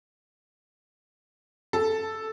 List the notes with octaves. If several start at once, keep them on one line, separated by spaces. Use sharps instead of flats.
A4